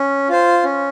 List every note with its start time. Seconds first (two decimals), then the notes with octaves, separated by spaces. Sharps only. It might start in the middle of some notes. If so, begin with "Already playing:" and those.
Already playing: C#4
0.29 F4 C5
0.64 C#4